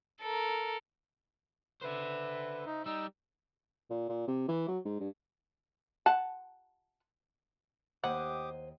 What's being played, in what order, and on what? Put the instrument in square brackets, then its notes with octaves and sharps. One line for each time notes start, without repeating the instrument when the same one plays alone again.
[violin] A4 A#4
[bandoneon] D3 B4 [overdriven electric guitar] C5 E5
[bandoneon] D#4
[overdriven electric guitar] G3 [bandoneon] D#4 E6
[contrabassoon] A#2
A#2
C3
E3
F#3
G#2
G2
[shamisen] F#5 A5
[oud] D#2 [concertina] G4 D6 D#6 [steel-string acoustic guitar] C5 D#5 [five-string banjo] F#5